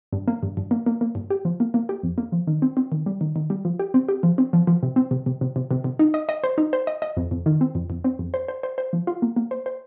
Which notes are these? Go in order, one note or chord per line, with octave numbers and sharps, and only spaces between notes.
G2
A#3
G2
G2
A#3
A#3
A#3
G2
G4
F3
A#3
A#3
G4
F2
A#3
F3
D#3
C4
C4
D#3
G3
D#3
D#3
G3
F3
G4
C4
G4
F3
C4
F3
F3
C3
C4
C3
C3
C3
C3
C3
C3
D#4
D#5
D#5
C5
D#4
C5
D#5
D#5
F2
F2
D#3
C4
F2
F2
C4
F2
C5
C5
C5
C5
F3
F4
A#3
A#3
C5
C5